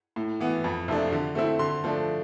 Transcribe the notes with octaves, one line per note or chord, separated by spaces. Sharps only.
A2
E3 B3
F2
C3 F3 A3 D4
D3
A3 C4 E4
D3 C6
F3 A3 D4